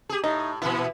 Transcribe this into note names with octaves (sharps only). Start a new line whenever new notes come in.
G4 G#4
A2 D#4
A#2 E3 B3 E4